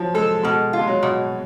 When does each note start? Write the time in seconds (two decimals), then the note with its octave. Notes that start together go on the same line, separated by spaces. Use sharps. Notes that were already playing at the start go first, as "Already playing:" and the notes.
Already playing: F3 F#3
0.14 G#3 A4
0.43 B2 G#3
0.73 F4
0.79 G#3
0.87 F#3
1.03 B2